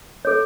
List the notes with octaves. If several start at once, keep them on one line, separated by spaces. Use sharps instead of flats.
A4 C#5